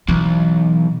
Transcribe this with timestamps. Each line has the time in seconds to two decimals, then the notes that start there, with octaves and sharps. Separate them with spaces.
0.08 B1 E3